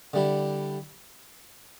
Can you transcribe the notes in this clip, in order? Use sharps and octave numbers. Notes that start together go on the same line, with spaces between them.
D3 G3 E4